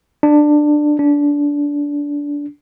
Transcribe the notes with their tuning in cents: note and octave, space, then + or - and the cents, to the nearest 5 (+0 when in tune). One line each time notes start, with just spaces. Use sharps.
D4 +15
D4 -20